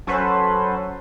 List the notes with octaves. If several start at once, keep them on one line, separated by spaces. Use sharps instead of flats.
F#3 C#4 F#4 A4 B4 C5